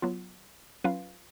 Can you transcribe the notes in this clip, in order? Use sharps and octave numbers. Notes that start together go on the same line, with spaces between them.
F#3 B3 F4
F#3 C#4 F4 B4 F5